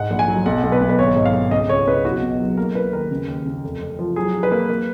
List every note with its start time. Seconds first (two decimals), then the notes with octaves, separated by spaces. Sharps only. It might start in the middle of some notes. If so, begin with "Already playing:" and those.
Already playing: G#2 F#5
0.10 A#1
0.19 G#5
0.28 F#3
0.46 B1 F#5
0.63 B1
0.72 B4
0.81 B1
0.89 B4
0.99 G#1 C#5
1.16 G#2
1.25 F5
1.34 G#2
1.51 C#2 D#5
1.69 C#2 C#5
1.87 C#2 B4
2.04 B1 F#4
2.22 B2
2.40 F#3
2.57 A#3 A#4
2.75 A#3 B4
2.92 D#2 A#4
3.11 C#3
3.28 D#2
3.46 C#3
3.64 F1
3.81 F2
3.99 F3
4.16 F#3 G#4
4.34 F#3
4.43 B4
4.51 A#3
4.69 A#3